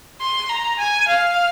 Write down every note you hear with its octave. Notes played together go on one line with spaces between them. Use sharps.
C6
A#5
G#5
F5